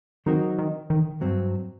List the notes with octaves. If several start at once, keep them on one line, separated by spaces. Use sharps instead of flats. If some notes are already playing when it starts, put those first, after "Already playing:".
D#3 F#3 C4 D#4 F#4 A#4
D#3
D#3
G2 F#3 C4